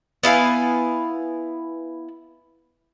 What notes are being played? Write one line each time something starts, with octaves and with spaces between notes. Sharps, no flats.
B3 E4 F5 G#5